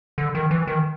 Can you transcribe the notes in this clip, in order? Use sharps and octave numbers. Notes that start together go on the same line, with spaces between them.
D3
D#3
E3
D#3